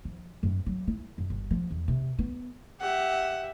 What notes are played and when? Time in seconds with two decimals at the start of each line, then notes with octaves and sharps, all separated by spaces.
0.05 F3
0.43 F#2
0.66 F#3
0.87 E4
1.18 F#2
1.30 G1
1.51 F3
1.71 E2
1.88 C3
2.19 B3
2.80 G4 E5 F#5